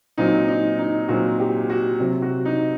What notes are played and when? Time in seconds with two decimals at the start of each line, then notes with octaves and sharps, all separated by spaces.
0.18 A#2 F#3 C4 D#4
0.48 D#4
0.78 D#4
1.08 A#2 F#3 C4 F#4
1.40 G4
1.70 F#4
1.99 C3 F#3 C4
2.22 F#4
2.45 D#4